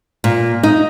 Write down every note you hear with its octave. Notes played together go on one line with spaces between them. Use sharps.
A#2
D#4